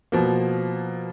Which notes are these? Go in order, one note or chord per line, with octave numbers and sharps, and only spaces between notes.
B2 F3 A#3